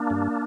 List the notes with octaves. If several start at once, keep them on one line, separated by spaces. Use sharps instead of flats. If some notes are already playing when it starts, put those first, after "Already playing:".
Already playing: A#3 D4
G2